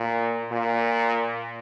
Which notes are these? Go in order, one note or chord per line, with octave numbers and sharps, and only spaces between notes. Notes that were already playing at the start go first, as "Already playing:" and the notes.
Already playing: A#2
A#2